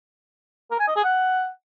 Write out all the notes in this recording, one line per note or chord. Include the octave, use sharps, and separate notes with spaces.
A#4
G#5
D#5
G#4
F#5